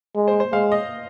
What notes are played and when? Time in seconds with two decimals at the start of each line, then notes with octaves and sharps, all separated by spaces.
0.15 G#3
0.28 C5
0.40 C5
0.52 G#3 F5
0.72 D#5